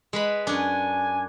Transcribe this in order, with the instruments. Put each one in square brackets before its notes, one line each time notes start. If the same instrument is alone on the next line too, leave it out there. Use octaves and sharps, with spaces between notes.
[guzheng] G#3 B4 B5
[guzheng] F#2 D4 [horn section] G#5